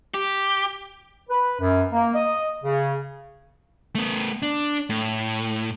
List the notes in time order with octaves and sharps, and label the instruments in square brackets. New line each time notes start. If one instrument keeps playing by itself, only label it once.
[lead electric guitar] G4
[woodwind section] B4
F#2
A#3
D#5
C#3
[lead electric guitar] A3 B3
D4
A2